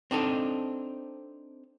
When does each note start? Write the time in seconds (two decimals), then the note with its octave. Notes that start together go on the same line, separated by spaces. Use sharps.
0.11 C4 D4 D#4 A4